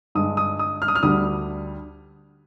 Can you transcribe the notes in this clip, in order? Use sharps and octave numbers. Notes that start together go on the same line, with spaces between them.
G2 D3 G#3 D#6
D#6
D#6
F6
D#6
F6
D2 D3 G3 D#6